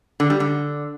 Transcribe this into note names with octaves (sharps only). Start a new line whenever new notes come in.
D3
G3
D3